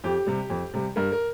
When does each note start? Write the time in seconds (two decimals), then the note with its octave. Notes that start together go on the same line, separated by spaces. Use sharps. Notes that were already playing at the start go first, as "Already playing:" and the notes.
0.04 F2 G4
0.27 C3 G3
0.50 F2
0.74 C3 G3
0.96 G2 A#4
1.12 A#4